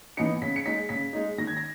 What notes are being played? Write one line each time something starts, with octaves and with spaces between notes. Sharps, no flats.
E3 B3 D#4 C#7
C#3 B6
C#7
G#3 D#4 B6
C#3 B6
G#3 D#4
D#3 A#6
G#6
A#6